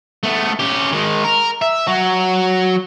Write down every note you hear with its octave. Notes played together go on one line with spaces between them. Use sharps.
A3 B3
C#4 G4
D#3 G#3
A#4
E5
F#3 F#4